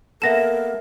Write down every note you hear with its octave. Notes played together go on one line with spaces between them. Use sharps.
A#3 B3 A4 A#4 E5 A#6 E7